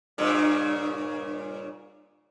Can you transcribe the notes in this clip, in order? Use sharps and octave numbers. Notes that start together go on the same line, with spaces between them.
G2 A#2 C#3